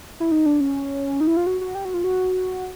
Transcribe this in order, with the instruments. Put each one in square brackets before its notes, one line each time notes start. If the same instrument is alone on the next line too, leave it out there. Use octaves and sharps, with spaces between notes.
[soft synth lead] E4
D#4
D4
C#4
D#4
E4
F4
F#4
F#4
G4
F#4
F4
F#4